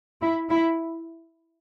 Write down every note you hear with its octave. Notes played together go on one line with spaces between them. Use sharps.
E4
E4